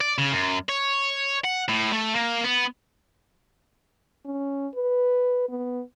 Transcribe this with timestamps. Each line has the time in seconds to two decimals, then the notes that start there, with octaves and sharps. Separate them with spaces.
0.01 D5
0.18 C#3
0.32 F#2
0.69 C#5
1.45 F#5
1.69 A2
1.93 A3
2.15 A#3
2.44 B3
4.25 C#4
4.75 B4
5.49 B3